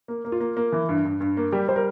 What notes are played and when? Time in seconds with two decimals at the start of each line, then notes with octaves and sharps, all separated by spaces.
0.08 A#3
0.25 A#3
0.32 F4
0.40 A#3
0.57 A#3
0.72 E3
0.89 G2
1.05 G2
1.21 G2
1.37 A#3
1.52 G3 G4
1.68 G3 C5
1.76 A#4